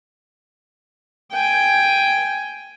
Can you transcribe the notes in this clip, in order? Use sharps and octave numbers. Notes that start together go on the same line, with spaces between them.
G5 G#5